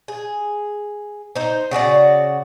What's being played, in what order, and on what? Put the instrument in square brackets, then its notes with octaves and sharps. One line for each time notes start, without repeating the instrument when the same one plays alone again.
[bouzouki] G#4
D#4 C5
C#3 F#4 G4 D5